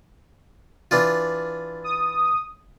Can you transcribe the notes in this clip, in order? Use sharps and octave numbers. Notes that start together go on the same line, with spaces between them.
E3 D4 F4
D#6